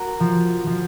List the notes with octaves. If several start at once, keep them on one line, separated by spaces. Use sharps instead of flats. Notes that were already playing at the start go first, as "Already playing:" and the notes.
Already playing: F#4 A#4
F3
F3